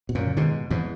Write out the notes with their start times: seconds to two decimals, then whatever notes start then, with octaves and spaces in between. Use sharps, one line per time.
0.09 B2
0.15 F#2 A#2
0.27 C#3
0.37 G#2 B2 D#3
0.70 E2 G#2 E3